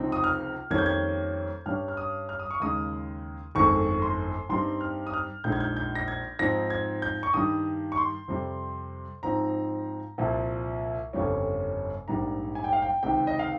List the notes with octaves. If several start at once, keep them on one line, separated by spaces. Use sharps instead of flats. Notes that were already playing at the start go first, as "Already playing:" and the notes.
Already playing: C#2 C3 F3 C4 D#4
D#6
F6
F2 D#3 G3 A#3 C#4 G#6
G6
G#6
G2 G3 C#4 F6
F6
D#6
F6
D#6
C#6
D#2 C#3 G#3 D#4 D#6
G1 F2 D#3 G#3 C#6
C6
G2 G3 C4 D#4 C6
F6
D#6
F6
A#1 A#2 G#3 D#4 G6
G#6
G6
G6
A#6
G#6
G#2 F3 C4 D#4 A#6
G#6
G6
C#6
G2 D#3 G3 D#6
C#6
C6
F2 C3 G3
G#2 F3 C4 D#4 A#5
C2 A#2 F3
G1 F2 C#3 G3 C#4
A#1 G#2 G3 A#3 A#5
G#5
G5
F5
G5
C#2 C3 D#3 G5
D#5
F5